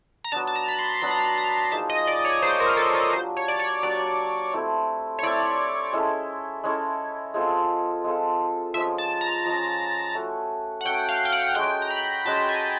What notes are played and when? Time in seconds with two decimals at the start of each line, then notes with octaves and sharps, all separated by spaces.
0.24 A#5
0.32 F#3 B3 D4 A5
0.47 A5
0.56 A#5
0.68 B5
0.79 C6
1.02 F#3 B3 D4 B5
1.11 A#5
1.19 B5
1.38 A#5
1.72 F3 A#3 D#4 G#4 A5
1.90 D#5
2.07 D5
2.25 C#5
2.42 F3 A#3 D#4 G#4 C5
2.60 A#4
2.77 A4
2.95 A4
3.13 F#3 A#3 D4 G4 C5
3.37 C#5
3.48 D5
3.59 C#5
3.82 F#3 A#3 D4 G4 D5
4.53 A3 C4 E4
5.19 C#5
5.23 A3 C4 E4 D5
5.93 G#3 C#4 E4 A4
6.64 G#3 C#4 E4 A4
7.34 G#3 C4 F4 A4
8.04 G#3 C4 F4 A4
8.74 F3 G#3 C#4 E5
8.98 A5
9.21 A#5
9.45 F3 G#3 C#4
10.15 A3 C#4 F#4
10.81 F#5
10.85 A3 C#4 F#4 G5
11.09 F5
11.25 G5
11.32 F#5
11.55 G#3 C#4 F#4 G5
11.82 A#5
11.91 B5
12.25 G#3 C#4 F#4 A5
12.49 G#5